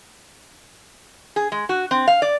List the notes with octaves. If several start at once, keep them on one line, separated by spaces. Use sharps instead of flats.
G#4
G#3
F#4
C4
F5
D5